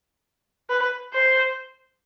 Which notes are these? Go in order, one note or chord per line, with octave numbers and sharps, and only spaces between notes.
B4
C5